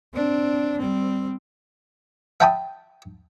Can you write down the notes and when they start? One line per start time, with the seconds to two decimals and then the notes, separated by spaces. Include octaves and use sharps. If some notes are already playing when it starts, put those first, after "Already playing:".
0.14 C4 D4
0.78 G3 C4
2.40 E5 F#5 G5 A5 B5 D#6